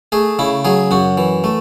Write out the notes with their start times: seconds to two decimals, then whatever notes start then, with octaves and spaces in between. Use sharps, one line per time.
0.12 A3 G#4
0.39 C#3 E4
0.65 F#3 G#4
0.91 F#2 F#4
1.17 E3
1.44 A3